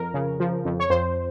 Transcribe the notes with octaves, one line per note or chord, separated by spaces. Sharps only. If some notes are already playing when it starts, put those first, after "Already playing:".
Already playing: F2 A#4
C#3
F3
F2
C#5
F2 C5